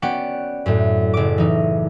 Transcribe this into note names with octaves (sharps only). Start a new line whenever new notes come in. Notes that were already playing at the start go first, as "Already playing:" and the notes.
B3 C#4 F#4 D5 F#5 G5
F#2 A2
F#1 D6
E3 D#4